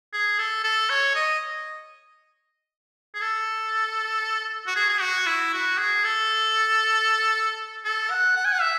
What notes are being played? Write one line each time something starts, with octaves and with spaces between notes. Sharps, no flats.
G#4
A4
A4
C#5
D#5
G#4
A4
F#4
G#4
G#4
F#4
E4
F#4
G#4
A4
A4
F#5
F#5
G#5
F#5
E5